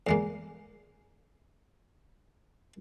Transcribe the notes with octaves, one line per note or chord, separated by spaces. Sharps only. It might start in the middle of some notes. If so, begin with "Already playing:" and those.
E2 G#3 A#3